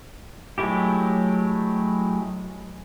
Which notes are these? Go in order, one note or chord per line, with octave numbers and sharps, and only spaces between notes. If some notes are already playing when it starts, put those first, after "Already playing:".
F#3 G#3 A3 E4 G4